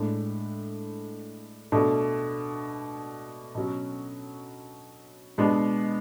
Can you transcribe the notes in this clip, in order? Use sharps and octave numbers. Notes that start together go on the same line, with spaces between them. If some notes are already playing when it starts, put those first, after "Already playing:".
Already playing: A2 G#3 D4
B2 A3 D4
B2 F#3 C#4
B2 G#3 B3 D4